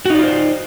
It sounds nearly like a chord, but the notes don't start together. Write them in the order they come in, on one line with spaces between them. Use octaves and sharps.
F#4 D#4 D5 F4 C5